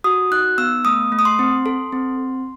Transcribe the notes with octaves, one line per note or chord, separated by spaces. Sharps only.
F#4 D#6
D#4 F#6
B3 E6
A3 D#6
A3
D#6
C6
C4
A4
C4